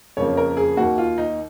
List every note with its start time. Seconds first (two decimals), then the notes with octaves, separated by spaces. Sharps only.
0.17 F2 C#3 F3 A#3 C#5
0.37 A#4
0.57 G#4
0.77 D#2 D#3 A#3 F#4
0.98 F4
1.18 D#4